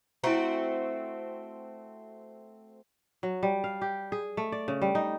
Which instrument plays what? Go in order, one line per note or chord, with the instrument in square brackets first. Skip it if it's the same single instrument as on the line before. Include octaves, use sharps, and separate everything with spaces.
[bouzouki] A3 C4 F#4 [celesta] E4 A#5
[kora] F#3
G3
F5
G4
G#4
A3
D5
C#3
G3
D#4